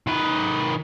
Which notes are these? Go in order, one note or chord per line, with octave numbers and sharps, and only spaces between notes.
D#3 B4